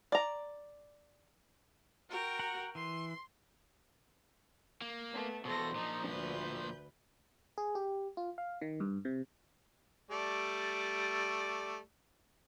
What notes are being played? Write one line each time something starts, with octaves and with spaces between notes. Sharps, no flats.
D5 A#5
F#4 A#4 G5
F#5 A#5
E3 C6
A#3
A3 B3
E2 B2 A4 C5 A#6
A#2 F3 D#4
D2 B4 G6
G#4
G4
F4
F5
D#3
G2
C3
G3 A3 D5